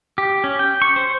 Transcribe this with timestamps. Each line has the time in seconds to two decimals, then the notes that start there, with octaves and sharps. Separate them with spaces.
0.18 G4
0.44 C#4
0.59 G5
0.82 C#6
0.96 C5